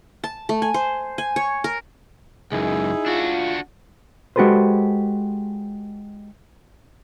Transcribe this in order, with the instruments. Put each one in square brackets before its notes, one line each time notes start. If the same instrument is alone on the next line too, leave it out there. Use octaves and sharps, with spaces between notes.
[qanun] A5
A3
G#5
C5
G#5
C#5
A#4
[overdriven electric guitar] C#2 F#2 [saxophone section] D#4 E4 G#4
[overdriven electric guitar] D4 F#4 [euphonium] F4
[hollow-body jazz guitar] G#3 F#4 G4 A4 B4 C5